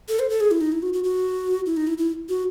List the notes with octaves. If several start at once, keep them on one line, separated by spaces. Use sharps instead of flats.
A4
C5
A4
G#4
E4
D#4
E4
F#4
F#4
F#4
E4
D#4
E4
E4
F#4